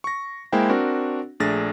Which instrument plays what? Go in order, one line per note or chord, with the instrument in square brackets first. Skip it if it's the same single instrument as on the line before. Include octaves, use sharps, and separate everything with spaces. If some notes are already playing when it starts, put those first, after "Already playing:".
[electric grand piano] C#6 A#6
G#3 A#3 E4 C5 G5
C4 D4 F#4 A#4
A#1 A3 D4 G#4 A6 A#6